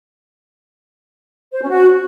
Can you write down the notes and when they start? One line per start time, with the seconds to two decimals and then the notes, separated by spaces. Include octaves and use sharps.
1.52 C5
1.61 C#4
1.69 F#4